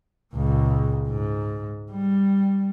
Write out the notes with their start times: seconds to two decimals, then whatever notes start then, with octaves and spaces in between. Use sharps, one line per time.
0.34 C#2 A#2
1.08 G#2
1.92 G3